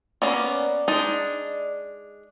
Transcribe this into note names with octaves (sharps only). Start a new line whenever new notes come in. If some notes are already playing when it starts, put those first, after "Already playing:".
A#3 B3 C#4 D5
G#3 D4 D#4